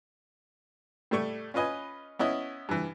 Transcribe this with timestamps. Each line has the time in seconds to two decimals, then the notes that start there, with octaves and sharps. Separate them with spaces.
1.11 A2 G3 A3 C#6
1.54 C#4 F4 B4 D#5 G#5
2.19 B3 C#4 E4 D#5
2.69 G2 E3